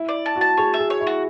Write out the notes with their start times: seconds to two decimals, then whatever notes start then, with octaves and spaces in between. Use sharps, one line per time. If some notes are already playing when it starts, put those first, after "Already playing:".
Already playing: E4
0.08 D5
0.26 A5
0.36 F#4
0.41 A5
0.57 G#4 C#5
0.74 E5
0.79 G#4
0.90 C#5
1.01 E4
1.07 F#4